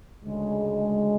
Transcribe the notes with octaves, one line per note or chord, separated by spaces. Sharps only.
D2 C#3 G#3